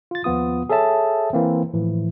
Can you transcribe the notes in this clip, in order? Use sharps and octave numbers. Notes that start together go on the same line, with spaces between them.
F4 A6
D#2 F3 B3 F4 D#6
G#4 A4 C#5 E5 A5
E3 A#3 C4
A2 E3 F3